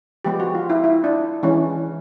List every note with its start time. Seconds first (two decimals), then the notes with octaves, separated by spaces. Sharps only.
0.25 F3 G#3 B3 G4
0.40 F#4
0.55 F4
0.70 E4
0.84 E4
1.04 D4
1.43 E3 G#3 C#4